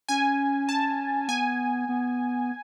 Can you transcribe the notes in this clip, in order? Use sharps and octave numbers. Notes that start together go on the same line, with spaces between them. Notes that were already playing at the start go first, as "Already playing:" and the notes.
C#4 G#5
A5
B3 G#5
B3